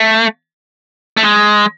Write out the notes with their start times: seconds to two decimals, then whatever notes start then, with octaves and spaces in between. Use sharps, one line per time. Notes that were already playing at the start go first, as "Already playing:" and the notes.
Already playing: A3
1.17 A3
1.23 G#3